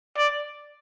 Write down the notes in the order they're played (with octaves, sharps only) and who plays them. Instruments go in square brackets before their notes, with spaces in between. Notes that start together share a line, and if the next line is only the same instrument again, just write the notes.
[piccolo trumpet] D5